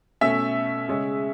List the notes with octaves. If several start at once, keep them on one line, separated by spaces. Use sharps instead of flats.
B2 A3 C#4 E5
C#3 G#3 C#4